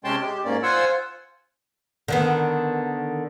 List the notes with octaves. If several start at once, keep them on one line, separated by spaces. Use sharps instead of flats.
C3 G#3 C#4 G5 A5 C6
G#3 G4
G#2 A#3 C#4 D5
F4 C5 F#5 G#5 E6
D3 D#3 B3